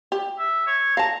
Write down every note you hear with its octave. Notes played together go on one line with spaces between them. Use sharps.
G4
E5
C#5
F5 A5 A#5